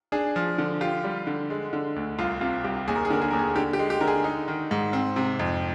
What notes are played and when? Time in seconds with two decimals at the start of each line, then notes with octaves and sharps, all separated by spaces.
0.12 D4 G#4
0.36 F3
0.58 D3
0.81 F4 G4
1.04 G3
1.27 D3
1.50 G#3
1.73 D3
1.96 D2
2.19 C2 F4
2.41 C3 F4
2.64 C2 G4
2.88 D#2 G#4
2.96 A#4
3.05 G#4
3.10 D3 A#4
3.22 G#4
3.31 D#2 A#4
3.39 G#4
3.56 D3 G4
3.73 G4
3.79 G#3
3.90 G4
4.01 D3 A#4
4.07 G#4
4.24 D#4
4.48 D#3
4.71 G#2
4.93 C4
5.16 C3
5.39 F2